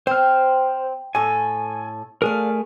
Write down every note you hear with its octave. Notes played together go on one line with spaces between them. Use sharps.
C4 C5 F6
A2 A4 G#5
A3 D4 G#4 A#4 F5